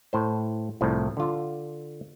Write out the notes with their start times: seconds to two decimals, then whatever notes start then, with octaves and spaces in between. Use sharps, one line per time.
0.13 A2 C5
0.81 C2 A2 F3
1.17 D3 F4